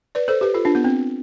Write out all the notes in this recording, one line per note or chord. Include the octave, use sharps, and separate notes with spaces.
B4 D5
A4 C5
G4 B4
F4 A4
D4 F4
B3
C4